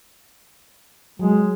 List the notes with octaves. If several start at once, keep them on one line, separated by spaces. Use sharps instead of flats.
F#3 G#3